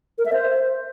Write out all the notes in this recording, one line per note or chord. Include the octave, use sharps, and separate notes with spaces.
A#4
E5
C5